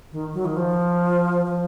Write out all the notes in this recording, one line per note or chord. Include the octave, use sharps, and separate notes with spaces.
D#3
F#3
D#3
F3
F3